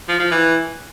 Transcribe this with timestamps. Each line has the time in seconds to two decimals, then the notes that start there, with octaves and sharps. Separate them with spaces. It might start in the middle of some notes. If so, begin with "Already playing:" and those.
0.09 F3
0.20 F3
0.31 E3